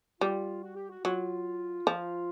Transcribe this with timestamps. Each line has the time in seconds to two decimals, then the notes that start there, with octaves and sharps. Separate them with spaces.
0.21 G3 F4
0.63 F#4
0.76 G4
0.90 F#4
1.04 F#3 F4
1.87 F3